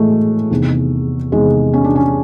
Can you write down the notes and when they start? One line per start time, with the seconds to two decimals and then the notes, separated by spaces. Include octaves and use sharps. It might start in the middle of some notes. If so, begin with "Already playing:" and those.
Already playing: A2 E3 G#3 A3
0.51 E2 C3 D#3
1.32 E2 C3 D#3 G#3
1.73 C#4
1.84 D4
1.95 C#4